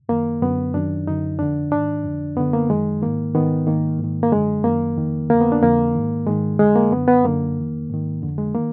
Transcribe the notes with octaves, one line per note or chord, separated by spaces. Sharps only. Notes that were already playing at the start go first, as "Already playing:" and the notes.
F#2 D#3 A#3
F#2 D3 B3
F#2 D#3 D4
F#2 D3 D#4
F2 D3 D4
G#2 D#3 D4
F2 D3
F#2 D3 B3
A#3
F#2 D#3 G#3
G#2 D#3 A#3
G#2 D#3 B3
G#2 D#3 A#3
G#2 D#3
A#3
F#2 D3 G#3
F#2 D#3 A#3
F2 D#3
F2 D3 A#3
B3
D4
F2 D3 A#3
G#2 D#3
G#2 D#3 G#3
F2 D3 G#3
A#3
F#2 D3 B3
B3
F#2 D3 A#3
F2 D#3
G#2 D#3
F2 D3
G#3
D#3 A#3